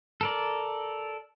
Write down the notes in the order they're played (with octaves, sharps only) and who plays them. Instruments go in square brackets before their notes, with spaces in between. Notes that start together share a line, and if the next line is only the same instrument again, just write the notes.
[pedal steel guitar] A4 A#4 D5